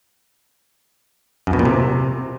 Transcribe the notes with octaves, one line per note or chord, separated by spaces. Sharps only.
F#2
B2
A#2
C3